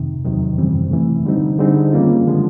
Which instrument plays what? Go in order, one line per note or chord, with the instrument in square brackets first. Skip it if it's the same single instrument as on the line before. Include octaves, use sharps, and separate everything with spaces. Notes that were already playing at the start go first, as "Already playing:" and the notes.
Already playing: [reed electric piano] F2 C3 D#3
E2 C3 D#3 F#3
F#2 C#3 E3 G3 C4
C3 E3 A3
D3 G3 C4 D#4
D3 G3 C4 D#4 G#4
D#3 G3 A#3 C#4 F4
D3 F3 G#3